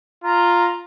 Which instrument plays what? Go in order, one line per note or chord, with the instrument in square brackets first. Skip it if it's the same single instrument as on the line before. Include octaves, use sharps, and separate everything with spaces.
[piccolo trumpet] F4 [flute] A#5